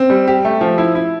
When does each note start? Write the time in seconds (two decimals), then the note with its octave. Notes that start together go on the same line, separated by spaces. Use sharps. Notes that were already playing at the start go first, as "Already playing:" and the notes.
Already playing: C4
0.10 G3
0.28 G4
0.45 A3
0.61 F3
0.78 E4
0.95 E4